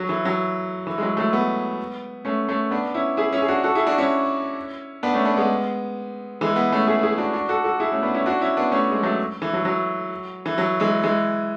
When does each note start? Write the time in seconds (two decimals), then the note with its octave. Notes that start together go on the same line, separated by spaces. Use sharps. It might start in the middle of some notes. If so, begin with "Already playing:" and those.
Already playing: F#3
0.09 E3
0.25 F#3
0.87 E3
0.98 G#3
1.02 F#3
1.17 F#3 A3
1.32 G#3 B3
2.25 A3 C#4
2.49 A3 C#4
2.71 B3 D4
2.94 C#4 E4
3.17 E4 G#4
3.33 C#4 E4
3.42 G#4
3.48 D4 F#4
3.64 F#4 A4
3.75 E4 G#4
3.87 D4 F#4
3.98 C#4 E4
5.03 B3 D4
5.14 A3 C#4
5.25 B3 D4
5.37 G#3 B3
6.41 E3 G#3
6.56 G#3 B3
6.72 A3 C#4
6.87 E4 G#4
7.03 E4 G#4
7.18 D4 F#4
7.33 D4 F#4
7.49 F#4 A4
7.64 F#4 A4
7.80 E4 G#4
7.92 A3 C#4
8.03 B3 D4
8.14 C#4 E4
8.26 D4 F#4
8.41 C#4 E4
8.57 B3 D4
8.72 A3 C#4
8.91 G#3
9.03 F#3 A3
9.42 E3
9.53 F#3
9.65 F#3
10.46 E3
10.58 F#3
10.80 E3 G#3
11.03 E3 G#3